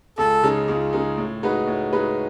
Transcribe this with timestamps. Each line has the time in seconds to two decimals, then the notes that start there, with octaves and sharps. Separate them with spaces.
0.18 C#2 A4
0.43 C#3 G#3 D#4
0.68 C#2
0.93 C#3 G#3 D#4
1.17 A2
1.43 G#3 D#4 F#4 B4
1.67 A2
1.92 G#3 D#4 F#4 B4